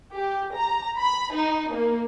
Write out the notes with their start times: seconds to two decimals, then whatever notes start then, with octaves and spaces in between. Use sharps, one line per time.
0.15 G4
0.54 A#5
0.97 B5
1.34 D#4
1.72 A#3